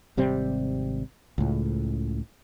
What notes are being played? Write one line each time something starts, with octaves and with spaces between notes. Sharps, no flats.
G#1 C3 G3 C4
C#2 A2